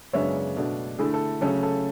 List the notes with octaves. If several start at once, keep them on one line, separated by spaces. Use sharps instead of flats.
F#2 C#3 G#3 B3 D4 C#5 E5
B2 A3 D4
D3 A3 E4 G#4
A4
C#3 F#3 A3 C#4 A4
A4